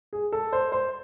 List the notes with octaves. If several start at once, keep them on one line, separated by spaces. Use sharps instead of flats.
G#4
A4
C5
C5